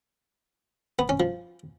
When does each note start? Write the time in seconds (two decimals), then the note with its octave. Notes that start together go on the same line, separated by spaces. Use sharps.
0.99 B3
1.09 C#4
1.20 F3